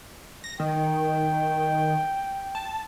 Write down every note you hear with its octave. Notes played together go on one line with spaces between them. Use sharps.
A#6
D#3 G5
A5